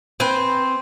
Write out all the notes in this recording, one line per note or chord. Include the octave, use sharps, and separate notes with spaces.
C4 B4 G#5